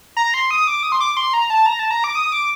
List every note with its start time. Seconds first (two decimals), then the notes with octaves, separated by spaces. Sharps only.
0.17 A#5
0.34 C6
0.51 D#6
0.67 D6
0.83 D#6
0.92 C6
1.01 D6
1.17 C6
1.33 A#5
1.50 A5
1.66 A#5
1.79 A5
1.91 A#5
2.04 D6
2.15 D#6
2.32 D6